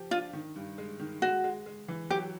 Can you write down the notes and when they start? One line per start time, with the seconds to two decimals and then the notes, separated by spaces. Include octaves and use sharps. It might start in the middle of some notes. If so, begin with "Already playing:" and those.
Already playing: F3 G4
0.11 D4 F4
0.33 D#3
0.56 G2
0.78 G#3
1.00 D#3
1.22 G#3 F#4
1.44 G#3
1.66 G#3
1.88 E3
2.10 F#3 G4